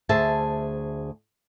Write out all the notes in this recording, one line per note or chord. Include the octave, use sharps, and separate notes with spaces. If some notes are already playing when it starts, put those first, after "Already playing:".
D2 G#4 C5 E5 A5